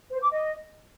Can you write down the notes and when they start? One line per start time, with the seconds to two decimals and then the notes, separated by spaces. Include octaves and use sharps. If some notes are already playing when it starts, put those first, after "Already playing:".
0.09 C5
0.20 D6
0.31 D#5